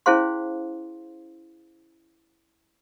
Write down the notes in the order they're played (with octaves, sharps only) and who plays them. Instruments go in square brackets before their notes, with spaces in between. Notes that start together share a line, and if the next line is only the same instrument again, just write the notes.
[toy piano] C#4 E4 G#4 C5 F5 C6